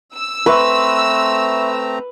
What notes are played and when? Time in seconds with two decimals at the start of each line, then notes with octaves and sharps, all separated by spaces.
0.16 E6
0.46 A3 C4 B4 E5 A#5 C6 C#6